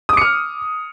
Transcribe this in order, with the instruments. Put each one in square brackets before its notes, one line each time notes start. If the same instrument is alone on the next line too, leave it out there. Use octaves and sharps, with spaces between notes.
[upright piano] D#6
D6
C#7
F6